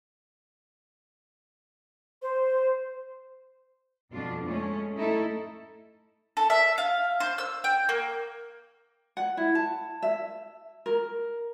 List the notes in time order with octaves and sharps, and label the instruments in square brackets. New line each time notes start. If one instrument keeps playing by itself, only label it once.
[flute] C5
[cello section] F2 B2 D4 F4
G#3 A3 C#4
A3 D#4 E4 A4
[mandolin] A4
E5
F5
C5
E6
G5
A#3
[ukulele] F#5
E4
A5
E5
A#4